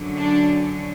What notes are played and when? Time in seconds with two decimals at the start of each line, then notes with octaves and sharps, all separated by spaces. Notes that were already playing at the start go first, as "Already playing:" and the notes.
Already playing: F#2 D3 F#3
0.17 D4